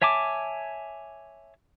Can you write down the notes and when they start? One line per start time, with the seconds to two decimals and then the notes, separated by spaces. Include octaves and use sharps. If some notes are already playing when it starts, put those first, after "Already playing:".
0.02 C#5 E5 G#5 A5 D6